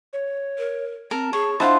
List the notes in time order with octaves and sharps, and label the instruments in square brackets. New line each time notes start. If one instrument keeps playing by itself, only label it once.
[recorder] C#5
[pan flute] A#4
[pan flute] C4 [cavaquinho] A#4 [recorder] A5
[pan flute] G#4 [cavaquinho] C#5
[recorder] D4 [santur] E4 D#5 C6 [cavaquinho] F4 F#5 A5 [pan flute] C5